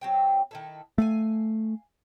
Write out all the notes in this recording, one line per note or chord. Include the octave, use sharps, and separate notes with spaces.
F#3 C4 G5
D#3 E4 A4
A3 F5 F#5 G#5